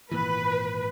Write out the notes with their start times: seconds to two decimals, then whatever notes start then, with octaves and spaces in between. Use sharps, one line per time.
0.11 G#1 A#2 E3 B4